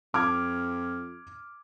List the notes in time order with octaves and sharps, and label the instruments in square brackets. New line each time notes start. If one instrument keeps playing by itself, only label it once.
[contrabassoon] F2 [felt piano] D6 F6 G#6